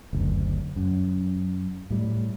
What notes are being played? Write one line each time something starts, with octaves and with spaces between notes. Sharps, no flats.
F#1 D2
F#2
A2 G3